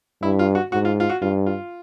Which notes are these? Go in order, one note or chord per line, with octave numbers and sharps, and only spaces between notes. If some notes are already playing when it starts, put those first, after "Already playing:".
G2 E4
F4
F#4
G#2 F#4
F4
F4
F#4
G2 F4
F4